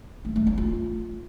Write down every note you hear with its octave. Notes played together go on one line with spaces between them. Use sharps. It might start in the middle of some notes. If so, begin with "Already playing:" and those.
A3
A3
C#4
F4